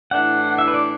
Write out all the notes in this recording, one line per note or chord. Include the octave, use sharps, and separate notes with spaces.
A2 E3 D4 F#5
E5
B4
D5